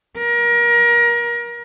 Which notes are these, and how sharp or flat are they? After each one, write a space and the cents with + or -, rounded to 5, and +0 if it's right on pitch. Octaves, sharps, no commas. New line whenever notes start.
A#4 +30